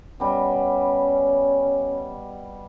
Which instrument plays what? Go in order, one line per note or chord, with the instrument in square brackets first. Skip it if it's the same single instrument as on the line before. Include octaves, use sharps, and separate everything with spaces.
[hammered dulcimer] B2 G3 B4 [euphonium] C#4